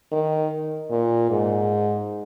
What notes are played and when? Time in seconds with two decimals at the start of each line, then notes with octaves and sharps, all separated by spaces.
0.12 D#3
0.90 A#2
1.30 G#2